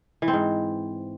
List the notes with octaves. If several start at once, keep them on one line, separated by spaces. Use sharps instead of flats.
E3
C4
G#2